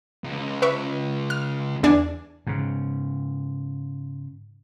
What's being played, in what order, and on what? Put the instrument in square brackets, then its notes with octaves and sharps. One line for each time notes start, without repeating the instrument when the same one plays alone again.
[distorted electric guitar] C#2
[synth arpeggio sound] B4 E5 C#6
F6
E2 D4 G#5
[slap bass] G#2 C#3